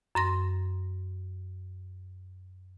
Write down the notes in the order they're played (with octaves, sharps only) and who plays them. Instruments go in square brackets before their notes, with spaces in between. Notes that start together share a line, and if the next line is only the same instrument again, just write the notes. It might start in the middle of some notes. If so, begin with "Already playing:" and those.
[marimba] F#2 C6 A#6